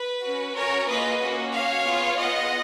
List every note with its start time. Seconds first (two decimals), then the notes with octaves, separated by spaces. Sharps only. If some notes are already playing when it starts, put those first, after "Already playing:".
Already playing: B4
0.24 C#4 F#4
0.56 C#4 F#4 A#4 C#5
0.88 A#3 F4 G#4 B4 D#5
1.21 A#3 C#4 F#4
1.53 C#4 F#4 C#5 F5
1.85 B3 F4 G#4
2.17 B3 F4 G#4 D#5 F#5